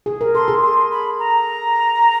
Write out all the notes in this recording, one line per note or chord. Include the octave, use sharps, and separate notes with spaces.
G#4
A#4
A4 C6
G#4
C6
B5
A#5